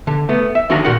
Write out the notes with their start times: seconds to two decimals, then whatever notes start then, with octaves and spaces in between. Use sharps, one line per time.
0.07 D3
0.29 A3 B3
0.55 E5
0.70 D3 D#3 F#4 F5 A5 A#5
0.85 A#2 F#4 A#4 F#5